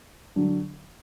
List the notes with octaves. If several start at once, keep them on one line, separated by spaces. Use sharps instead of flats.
D3 F#3 D4